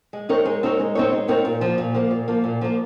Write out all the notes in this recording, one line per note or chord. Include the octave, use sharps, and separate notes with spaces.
G#3
C4 D#4 A#4 C#5
G#3
C4 D#4 A#4 C#5
G#3
C4 D#4 A#4 C#5
G#3
C4 D#4 A#4 C#5
A#2
F3 A#3
A#2
F3 A#3
A#2
F3 A#3
A#2
F3 A#3